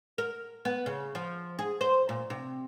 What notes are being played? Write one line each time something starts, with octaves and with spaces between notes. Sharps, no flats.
A#4
B3
C#3
F3
G#4
C5
A#2
C3